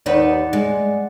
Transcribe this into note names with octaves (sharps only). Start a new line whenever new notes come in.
D#2 D#4 B4 D5 F#5
G#3